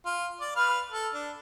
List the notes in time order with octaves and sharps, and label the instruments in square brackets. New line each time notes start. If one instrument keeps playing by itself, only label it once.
[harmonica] F4
D5 D6
B4 F5 F6
A4
D4